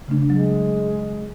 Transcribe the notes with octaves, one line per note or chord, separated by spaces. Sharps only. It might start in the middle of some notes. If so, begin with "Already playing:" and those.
C#3 A3 D4
F#3 G#3